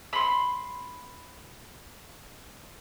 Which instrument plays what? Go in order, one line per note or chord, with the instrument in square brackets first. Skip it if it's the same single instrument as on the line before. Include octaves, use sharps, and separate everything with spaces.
[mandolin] B5 C6